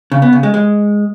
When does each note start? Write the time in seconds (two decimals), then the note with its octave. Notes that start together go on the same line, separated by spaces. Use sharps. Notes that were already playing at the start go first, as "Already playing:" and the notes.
0.12 C#3
0.22 B3
0.33 C#3
0.43 G#3
0.54 G#3